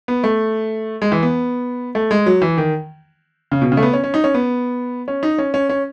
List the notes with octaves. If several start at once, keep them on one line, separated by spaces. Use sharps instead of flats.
B3
A3
G#3
E3
B3
A3
G#3
F#3
E3
D#3
C#3
B2
C#3
A3
B3
C#4
C#4
D#4
C#4
B3
C#4
D#4
C#4
C#4
C#4